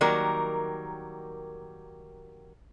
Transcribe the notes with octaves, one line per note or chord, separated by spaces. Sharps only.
D#3 F#3 G3 A#3 A#4